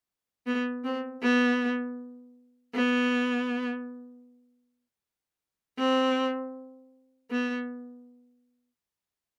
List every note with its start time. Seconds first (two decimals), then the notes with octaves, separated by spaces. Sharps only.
0.47 B3
0.84 C4
1.22 B3
2.75 B3
5.78 C4
7.30 B3